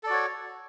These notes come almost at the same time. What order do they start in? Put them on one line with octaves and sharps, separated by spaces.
A4 D5 F#4 C#5